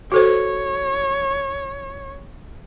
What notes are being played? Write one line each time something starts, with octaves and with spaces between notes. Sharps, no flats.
F#4 A4 C5 C#5